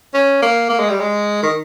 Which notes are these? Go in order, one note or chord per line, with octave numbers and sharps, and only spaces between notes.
C#4
A#3
A#3
G#3
G3
G#3
D#3